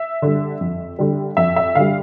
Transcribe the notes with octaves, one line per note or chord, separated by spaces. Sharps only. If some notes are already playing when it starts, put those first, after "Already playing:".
Already playing: E5
D3 G3
F2
D3 G3
F2 E5
E5
D3 G3 F5